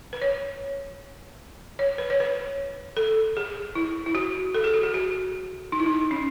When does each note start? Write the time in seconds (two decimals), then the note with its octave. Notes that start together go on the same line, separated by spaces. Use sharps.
0.13 B4
0.22 C#5
1.79 C#5
1.98 B4
2.10 C#5
2.20 B4
2.97 A4
3.37 G#4
3.75 E4
4.06 E4
4.15 F#4
4.54 A4
4.64 G#4
4.74 F#4
4.83 G#4
4.94 F#4
5.72 D#4
5.80 E4
5.86 D#4
6.11 C#4